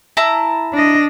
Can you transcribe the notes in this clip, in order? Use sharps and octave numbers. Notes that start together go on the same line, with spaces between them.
E4 A5 A#5
D4 D#5